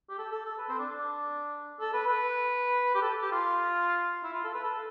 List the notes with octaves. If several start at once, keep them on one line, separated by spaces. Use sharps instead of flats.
G4
A4
A4
A4
B4
C4
D4
D4
A4
B4
B4
G4
A4
G4
F4
E4
F4
A4
B4
A4